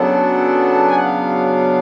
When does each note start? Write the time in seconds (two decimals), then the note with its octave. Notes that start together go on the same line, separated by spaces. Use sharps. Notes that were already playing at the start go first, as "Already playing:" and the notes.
Already playing: C#3 F#3 B3 D4 A4
0.87 G#5
0.96 F#5
1.03 F5